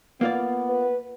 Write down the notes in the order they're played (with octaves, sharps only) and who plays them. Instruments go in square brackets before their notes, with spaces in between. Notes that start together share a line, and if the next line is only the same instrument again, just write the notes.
[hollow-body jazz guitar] A#3 F4 D5 [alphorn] B3
[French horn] B4